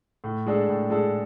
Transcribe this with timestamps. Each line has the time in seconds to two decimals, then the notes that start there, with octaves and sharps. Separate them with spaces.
0.24 A2
0.47 G#3 D4 A4
0.69 A2
0.90 G#3 D4 A4